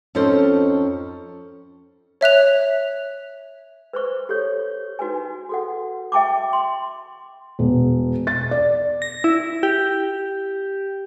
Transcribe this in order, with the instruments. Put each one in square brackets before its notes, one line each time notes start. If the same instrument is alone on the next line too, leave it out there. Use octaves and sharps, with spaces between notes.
[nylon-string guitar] F2 C#4 D#4 A4 C5
[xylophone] C#5 E5 F#6 F7
[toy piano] B4 C5 C#6
G4 A4 C#5
D#4 F#4 B4 G#5
F#4 A4 F#5
E5 G5 A5 C#6 D6
C6
[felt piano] E1
A6
D5
[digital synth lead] A#6
E4
G4